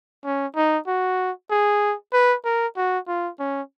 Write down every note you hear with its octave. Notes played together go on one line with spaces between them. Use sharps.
C#4
D#4
F#4
G#4
B4
A#4
F#4
F4
C#4